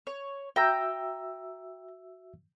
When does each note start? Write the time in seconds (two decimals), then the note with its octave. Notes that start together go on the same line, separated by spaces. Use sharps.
0.07 C#5
0.56 F#4 E5 G5 A#5 E6